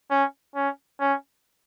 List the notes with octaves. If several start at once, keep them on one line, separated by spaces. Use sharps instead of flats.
C#4
C#4
C#4